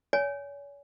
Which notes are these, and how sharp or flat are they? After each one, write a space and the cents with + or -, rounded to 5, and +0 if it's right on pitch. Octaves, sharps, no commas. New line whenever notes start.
C#5 +40 G#5 +0